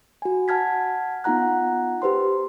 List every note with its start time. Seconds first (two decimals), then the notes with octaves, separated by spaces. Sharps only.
0.22 F#4 G#5
0.48 F#5 A5 F6 G#6 B6
1.24 B3 D#4 F4 F#5 A#5 F#6
2.02 G4 B4 C5 C6